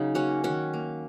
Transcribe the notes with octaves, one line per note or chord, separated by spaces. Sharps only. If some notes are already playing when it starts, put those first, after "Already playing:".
Already playing: C#3 F#3 D#4
A#3 C#4 F#4
D#3 C#4 F#4
A#3